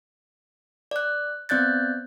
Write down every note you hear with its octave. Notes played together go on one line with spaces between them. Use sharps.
D5 F#6
B3 C4 D5 F#6 G6 A6